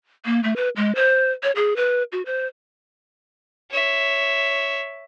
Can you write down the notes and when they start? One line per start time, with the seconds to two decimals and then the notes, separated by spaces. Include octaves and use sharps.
0.25 A#3
0.44 A3
0.56 B4
0.76 G#3
0.95 C5
1.43 C#5
1.56 G#4
1.76 B4
2.12 F#4
2.26 C5
3.71 C#5 E5